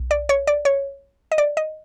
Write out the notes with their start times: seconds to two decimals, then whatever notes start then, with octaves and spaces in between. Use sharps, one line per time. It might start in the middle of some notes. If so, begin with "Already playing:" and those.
Already playing: B1
0.11 D5
0.29 C#5
0.47 D5
0.65 C#5
1.32 D#5
1.38 D5
1.57 D#5